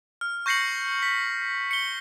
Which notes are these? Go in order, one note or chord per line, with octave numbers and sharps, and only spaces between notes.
F6
C#6 G6 A#6 C7 C#7 F#7
B6
C#7 G7